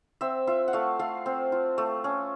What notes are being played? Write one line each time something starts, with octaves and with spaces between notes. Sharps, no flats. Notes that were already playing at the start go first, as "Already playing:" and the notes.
C4 E5
F4 E5
F#5
A3 F5
A3 F5
C4
F4
A3
C#4